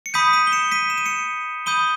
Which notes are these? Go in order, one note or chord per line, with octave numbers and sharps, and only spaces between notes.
C#7
B5 D#6 G6 B6 D#7
B6 D#7
G7
C#7 E7
B6 D#7
E7
D#7
C#7 E7
B5 D#6 G6 D#7 G7